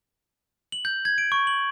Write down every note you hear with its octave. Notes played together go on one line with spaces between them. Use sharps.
F#7
G6
G#6
D7
C#6
F#7